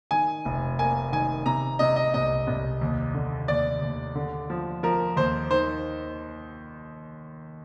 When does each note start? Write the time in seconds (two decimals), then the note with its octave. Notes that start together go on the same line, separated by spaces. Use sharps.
0.11 D#3 G#5
0.45 F1
0.79 A#3 G#5
1.12 D#3 G#5
1.46 C3 A#5
1.79 C3 D#5
1.96 D#5
2.14 C2 D#5
2.47 C2
2.81 D#2
3.14 D3
3.48 D#2 D5
3.82 D#2
4.15 D3
4.50 F3
4.83 F3 A#4
5.16 D#2 C5
5.51 D#3 C5